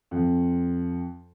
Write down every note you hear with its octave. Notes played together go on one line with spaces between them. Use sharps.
F2